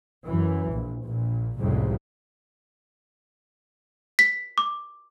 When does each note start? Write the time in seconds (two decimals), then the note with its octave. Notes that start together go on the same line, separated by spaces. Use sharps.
0.25 F#2 E3
0.71 A#1
1.06 A#1 A#2
1.59 C2 F2 A2 C#3 G3 G#3
4.19 B6
4.58 D6